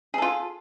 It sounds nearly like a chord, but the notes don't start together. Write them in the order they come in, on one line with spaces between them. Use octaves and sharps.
G#4 A4 F4